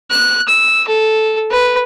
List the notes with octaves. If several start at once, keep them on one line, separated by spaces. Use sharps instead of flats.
F#6
E6
A4
B4